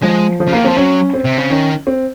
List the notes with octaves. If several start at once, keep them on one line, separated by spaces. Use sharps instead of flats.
F3 G#3
F3
C#3
D#3 A#3
F3 C4
F#3 C#4
C4
C3
C#3
D#3 C#4
C4